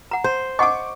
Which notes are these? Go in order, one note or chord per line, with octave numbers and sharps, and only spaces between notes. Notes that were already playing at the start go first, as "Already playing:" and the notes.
F#5 A#5
C5
D#5 F#5 C#6 D6